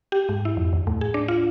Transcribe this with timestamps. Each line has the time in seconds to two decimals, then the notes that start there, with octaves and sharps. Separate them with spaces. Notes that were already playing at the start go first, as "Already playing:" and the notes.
0.12 G4
0.29 G#2
0.45 E4
0.57 F2
0.73 D#2
0.87 A2
1.01 G#4
1.14 D4
1.28 F4